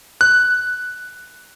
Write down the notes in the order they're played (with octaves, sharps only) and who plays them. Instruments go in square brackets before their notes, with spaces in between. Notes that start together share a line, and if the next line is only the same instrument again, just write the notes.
[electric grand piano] F#6